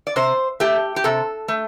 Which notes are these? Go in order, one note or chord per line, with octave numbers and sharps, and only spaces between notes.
D5
C3 C5
A3 G4
G4
C3 A4
A3